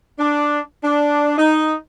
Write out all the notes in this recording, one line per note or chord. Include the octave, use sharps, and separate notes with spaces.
D4
D4
D#4